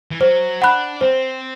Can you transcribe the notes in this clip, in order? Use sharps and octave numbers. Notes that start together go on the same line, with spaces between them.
E3
F#3 C5
D4 F#5 B5 F#6
C4 C5